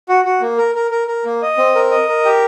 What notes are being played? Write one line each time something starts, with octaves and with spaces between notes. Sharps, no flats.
F#4
F#4
A#3
A#4
A#4
A#4
A#4
A#3
D#5
C4
A#4
D#5
A#4
G4